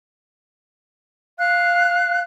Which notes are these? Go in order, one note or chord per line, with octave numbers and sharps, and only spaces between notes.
F5 F#6